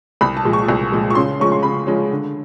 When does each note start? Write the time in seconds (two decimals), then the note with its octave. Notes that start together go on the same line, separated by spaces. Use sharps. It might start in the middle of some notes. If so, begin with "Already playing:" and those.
0.21 C2 B5
0.37 A5
0.45 A#2 F3 G#3
0.53 C#6
0.68 C2
0.92 A#2 F3 G#3
1.10 C#6
1.15 C#3 C6
1.40 F3 G#3 C#4 C#6
1.52 C6
1.63 C#3 B5
1.87 F3 G#3 C#4
2.11 D3